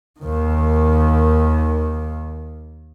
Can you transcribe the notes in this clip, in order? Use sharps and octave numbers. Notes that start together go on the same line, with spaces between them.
D#2 D#3